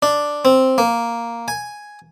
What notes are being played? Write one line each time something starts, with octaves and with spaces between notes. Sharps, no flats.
D4
C4
A#3
G#5